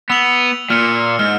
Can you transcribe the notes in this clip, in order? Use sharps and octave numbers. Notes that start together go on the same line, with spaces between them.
B3 E6 F7 F#7
A#2 F6 C#7
G#2 F6